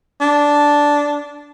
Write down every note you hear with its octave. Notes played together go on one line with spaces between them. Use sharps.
D4